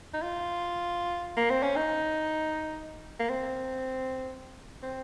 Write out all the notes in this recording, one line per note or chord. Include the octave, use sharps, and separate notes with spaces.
D#4
F4
A#3
C4
C#4
D#4
A#3
C4
C4